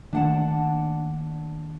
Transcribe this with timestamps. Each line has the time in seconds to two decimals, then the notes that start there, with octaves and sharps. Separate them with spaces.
0.13 D#3 A3 A#3 D4 F#5 A5